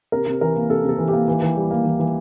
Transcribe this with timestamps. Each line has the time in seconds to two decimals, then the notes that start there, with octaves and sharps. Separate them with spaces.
0.12 C3 A#4
0.27 C3
0.41 E3 A#4
0.56 A#3
0.70 C3 A4
0.84 C3 A4
0.98 E3
1.08 A#3 G4
1.28 E3
1.42 E3
1.57 G3
1.71 A#3
1.85 E3
1.99 E3